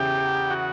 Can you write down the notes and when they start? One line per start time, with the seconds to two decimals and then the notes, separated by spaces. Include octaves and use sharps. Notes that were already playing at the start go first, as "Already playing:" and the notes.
Already playing: E2 C#3 E3 G4
0.50 F#4